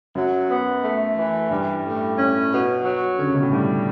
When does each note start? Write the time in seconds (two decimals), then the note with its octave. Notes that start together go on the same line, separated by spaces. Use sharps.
0.15 F#2 F#3
0.49 B3
0.83 A3
1.17 E3
1.50 G2 G3
1.84 A2
2.17 C#4
2.51 B2
2.84 F#3
3.18 D3 C#4
3.27 C#3
3.35 B2
3.43 A2
3.51 G2 G3